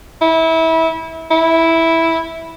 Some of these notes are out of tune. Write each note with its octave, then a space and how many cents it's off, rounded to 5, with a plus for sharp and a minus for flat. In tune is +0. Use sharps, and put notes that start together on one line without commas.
E4 -25
E4 -5